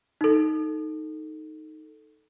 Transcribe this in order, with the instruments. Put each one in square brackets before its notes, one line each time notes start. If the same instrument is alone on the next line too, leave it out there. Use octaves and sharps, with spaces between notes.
[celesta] D#4 A4